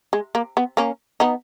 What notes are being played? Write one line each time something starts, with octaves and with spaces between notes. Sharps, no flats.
G#3
A#3
B3
A#3 C#4
B3 D#4